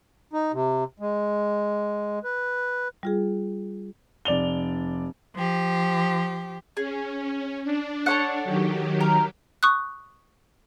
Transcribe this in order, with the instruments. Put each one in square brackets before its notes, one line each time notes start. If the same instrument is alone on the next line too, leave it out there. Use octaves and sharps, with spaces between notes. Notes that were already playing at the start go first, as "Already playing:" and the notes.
[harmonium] D#4
C3
G#3
B4
[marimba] G3 F4 G#4
[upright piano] F1 D5 F7 G7
[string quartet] F3 G4
[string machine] C#4 [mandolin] G#4
[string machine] D4
[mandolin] A4 C#5 F#5
[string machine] D#3 F#3 G4
[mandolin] A#4
[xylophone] C#6 D#6 F#6